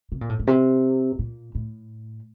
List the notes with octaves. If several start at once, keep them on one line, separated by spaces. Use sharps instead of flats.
C3
A#2
A2
A2
C3
A#2
A2